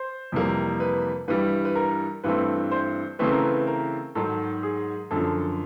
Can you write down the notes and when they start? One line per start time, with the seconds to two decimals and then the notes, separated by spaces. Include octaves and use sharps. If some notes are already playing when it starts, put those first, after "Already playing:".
Already playing: C5
0.32 F2 C3 E3 G3 A#3
0.80 B4
1.28 G2 E3 G3 B4
1.65 B4
1.76 A#4
2.24 G2 E3 A3 C4 B4
2.71 C5
3.19 C#3 E3 A3 C4 B4
3.32 A#4
3.44 B4
3.67 A#4
4.15 G#2 D#3 F#3 A4
4.63 G#4
5.11 F#2 D3 F3 A4